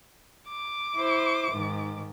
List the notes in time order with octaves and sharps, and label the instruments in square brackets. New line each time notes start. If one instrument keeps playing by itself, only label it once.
[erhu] D6
[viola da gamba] E4 C5
G#2 D#3